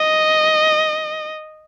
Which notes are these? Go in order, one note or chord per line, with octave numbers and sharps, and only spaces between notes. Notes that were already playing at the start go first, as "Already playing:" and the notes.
Already playing: D#5